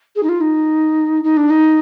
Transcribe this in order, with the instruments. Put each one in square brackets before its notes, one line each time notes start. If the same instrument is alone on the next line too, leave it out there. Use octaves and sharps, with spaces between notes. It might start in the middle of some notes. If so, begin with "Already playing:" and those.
[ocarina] G#4
D#4
F4
D#4
D#4
D4
D#4